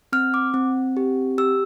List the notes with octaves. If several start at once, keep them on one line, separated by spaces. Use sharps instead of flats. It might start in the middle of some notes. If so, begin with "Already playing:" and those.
C4 F6
D6
C4
G4
G4 E6